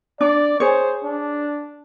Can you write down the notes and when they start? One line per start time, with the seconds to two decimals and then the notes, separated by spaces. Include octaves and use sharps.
0.21 D4 D5
0.60 G#4 C5 C#5
1.03 D4